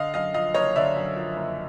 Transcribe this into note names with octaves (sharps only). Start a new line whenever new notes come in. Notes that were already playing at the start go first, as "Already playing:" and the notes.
Already playing: D3 D#5 F5
F#2 D#5 F5
F3 D#5 F5
F#1 C#5 D#5
D3 D5 E5
F#2
F3
F#1